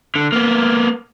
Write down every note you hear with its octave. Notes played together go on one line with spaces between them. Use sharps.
D3
A#3 B3